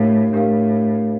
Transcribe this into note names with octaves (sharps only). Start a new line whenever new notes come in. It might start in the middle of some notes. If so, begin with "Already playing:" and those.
Already playing: A2 D4 G4 A#4 F5
A2 D4 G4 A#4 F5